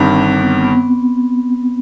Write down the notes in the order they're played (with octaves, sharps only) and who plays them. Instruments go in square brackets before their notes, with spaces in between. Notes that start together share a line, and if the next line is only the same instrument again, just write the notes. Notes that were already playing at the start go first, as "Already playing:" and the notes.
Already playing: [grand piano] G1 G2 D#3 G3 [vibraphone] C4
[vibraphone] B3
B3